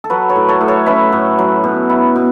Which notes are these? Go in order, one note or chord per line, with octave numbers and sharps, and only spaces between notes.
A4
F#3 F#4 B4
A4 C#5
A2
A4 C#5
A2
A4 C#5
C#4 B4 E5
A2
F#3
B2
E4
B2